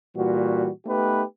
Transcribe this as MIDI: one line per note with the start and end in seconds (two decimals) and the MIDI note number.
0.16 0.69 46
0.16 0.69 52
0.16 0.69 55
0.16 0.69 66
0.87 1.23 57
0.87 1.23 59
0.87 1.23 63
0.87 1.23 67
0.87 1.23 71